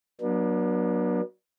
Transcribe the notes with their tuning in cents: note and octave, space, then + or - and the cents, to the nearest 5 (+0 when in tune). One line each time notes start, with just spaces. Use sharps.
F#3 +0 B3 -45 D4 +30